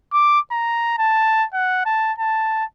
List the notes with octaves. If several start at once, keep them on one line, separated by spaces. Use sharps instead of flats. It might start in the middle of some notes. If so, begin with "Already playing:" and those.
D6
A#5
A5
F#5
A5
A5